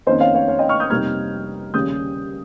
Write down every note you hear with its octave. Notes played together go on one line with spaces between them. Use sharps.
F2 D#3 A#3 C#4 C5 D#5
C#5 F5
C#5 F5
C#5 F5
D#5 G5
C#6 F6
D#6 G6
F2 C3 G3 A#3 D#4 F6 G#6
D#2 C#3 G3 C#4 D#6 G6